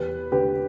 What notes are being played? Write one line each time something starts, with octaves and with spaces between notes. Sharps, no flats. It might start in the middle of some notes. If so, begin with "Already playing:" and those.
Already playing: E2 G4 B4
D3 G4 B4